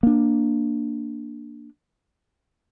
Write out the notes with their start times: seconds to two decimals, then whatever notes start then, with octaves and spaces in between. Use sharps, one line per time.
0.03 A#3 D4